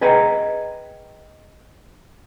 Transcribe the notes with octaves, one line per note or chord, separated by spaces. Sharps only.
G#4 B4 D#5 G5 G#5 A#5